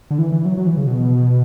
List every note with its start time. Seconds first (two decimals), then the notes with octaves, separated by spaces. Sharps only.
0.11 D3
0.19 E3
0.32 E3
0.45 F#3
0.58 F#3
0.67 E3
0.77 C#3
0.87 B2